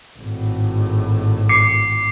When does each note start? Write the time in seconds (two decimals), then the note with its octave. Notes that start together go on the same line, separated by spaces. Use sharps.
0.18 G#1 A2
1.49 D6 C7 C#7